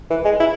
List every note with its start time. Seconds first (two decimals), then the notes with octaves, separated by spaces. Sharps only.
0.10 E3
0.25 G#3
0.40 E4